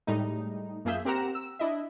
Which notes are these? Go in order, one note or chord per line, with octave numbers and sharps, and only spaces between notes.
A2 G3 G#3 D#4
F#2 A#3 F4 G#4 E5 G6
C4 G4 A#4 F#5 A#5 E7
E6
D4 E4 D#5 E5